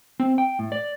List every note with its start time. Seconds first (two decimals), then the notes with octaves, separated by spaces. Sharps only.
0.20 C4
0.38 G5
0.59 A2
0.72 D5